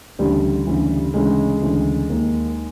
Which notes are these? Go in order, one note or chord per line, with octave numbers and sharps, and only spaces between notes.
D2 C#3 E3 G3
D2 C#3 E3
D2 C#3 E3 G#3
D2 C#3 E3
D#2 D#3